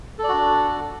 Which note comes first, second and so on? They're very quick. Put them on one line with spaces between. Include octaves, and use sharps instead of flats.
A4 D5 F#4 D4